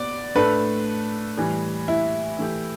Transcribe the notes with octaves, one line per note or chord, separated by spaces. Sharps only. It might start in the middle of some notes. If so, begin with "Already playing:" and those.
Already playing: B3 D5
A2 A3 D4 A4 B4
A2 E3 G3
E4
E3 A3 G4